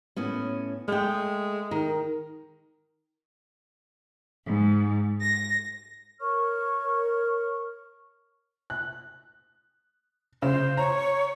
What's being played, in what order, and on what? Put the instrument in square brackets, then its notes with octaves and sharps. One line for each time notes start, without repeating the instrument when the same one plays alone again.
[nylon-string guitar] A2 B3 C#4
[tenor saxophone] G#3 [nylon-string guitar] A3 G5
[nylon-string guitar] D#3 A#4
[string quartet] G#2
A#6
[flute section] A#4 C#5 C#6 F6
[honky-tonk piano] F#6
[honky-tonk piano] C#3 [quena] C5
[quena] C#5 [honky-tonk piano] A#5